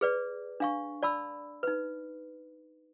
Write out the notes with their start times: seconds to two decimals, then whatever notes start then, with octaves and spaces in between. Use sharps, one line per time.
0.01 G#4 B4 D5
0.60 D4 F5 C#6
1.03 D5 A5 B5 E6
1.63 D#4 B4